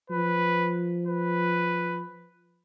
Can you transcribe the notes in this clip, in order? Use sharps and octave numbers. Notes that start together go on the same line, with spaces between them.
F3 B4
B4